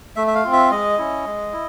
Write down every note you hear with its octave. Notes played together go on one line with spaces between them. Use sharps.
A3 E5
E5
F5
C4 F4
E5
G#3 D#5
C#4 E4
G#3
E4